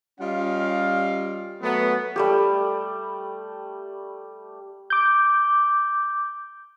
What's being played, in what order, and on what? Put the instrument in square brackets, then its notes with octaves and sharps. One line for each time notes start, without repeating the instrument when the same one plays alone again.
[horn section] G3 C#4 F4 D#5 F5
F#3 A3 B3
[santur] G3 A3 G4
[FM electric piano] D6 G6